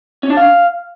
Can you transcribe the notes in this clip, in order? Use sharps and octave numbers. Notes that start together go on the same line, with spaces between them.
C#4
D4
F5